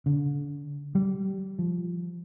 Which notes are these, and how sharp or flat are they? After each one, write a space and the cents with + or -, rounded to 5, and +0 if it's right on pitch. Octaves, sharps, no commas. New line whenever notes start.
D3 -35
G3 -20
F3 -5